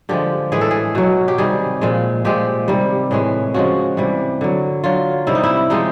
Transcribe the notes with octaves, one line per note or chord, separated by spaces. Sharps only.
D3 F3 G#3 G4
A2 E3 G#3 G#4
A4
G#4
B2 F#3
G4
C3 D#3 G3 G#4
A#2 F3 G#3
A#2 F3 G#3 G4
C3 D#3 G3
A2 E3 G#3
C#3 F3 G#3 F#4
C3 E3 G3
D3 F#3
D3 F#3 F4
C3 D#3 G3 E4
D#4
E4
C3 F3 G#3 D#4